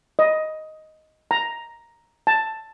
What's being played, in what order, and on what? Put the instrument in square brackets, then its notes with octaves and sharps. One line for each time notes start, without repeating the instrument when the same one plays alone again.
[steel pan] D#5
A#5
A5